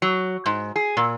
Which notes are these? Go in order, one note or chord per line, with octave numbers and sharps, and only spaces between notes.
F#3
G#2
G#4
A#2